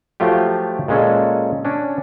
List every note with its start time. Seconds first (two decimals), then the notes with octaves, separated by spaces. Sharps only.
0.20 F3 F#3 A3 F4 G4
0.88 A#2 G#3 C#4 A4
1.65 C#4 D4